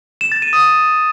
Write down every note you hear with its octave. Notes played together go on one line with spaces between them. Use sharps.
E7
A6
D#7
D#6